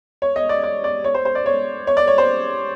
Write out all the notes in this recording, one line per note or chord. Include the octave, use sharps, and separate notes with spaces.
C#5
D#5
D5
D5
D5
C#5
C5
C5
D5
C#5
C#5
D5
C#5
C5